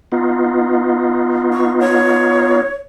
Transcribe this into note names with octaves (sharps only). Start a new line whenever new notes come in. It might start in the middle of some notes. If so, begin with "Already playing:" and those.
B3 D#4 F4
C#6
C#5